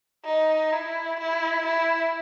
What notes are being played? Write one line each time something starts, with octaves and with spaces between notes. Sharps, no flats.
D#4
E4
E4
E4